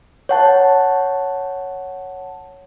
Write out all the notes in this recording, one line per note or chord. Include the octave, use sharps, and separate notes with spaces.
C#5 F#5 A5